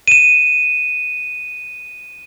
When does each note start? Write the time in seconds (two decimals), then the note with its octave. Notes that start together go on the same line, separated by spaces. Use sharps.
0.08 D#7 E7